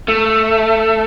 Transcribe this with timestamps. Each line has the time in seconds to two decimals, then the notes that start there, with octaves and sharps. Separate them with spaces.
0.08 A3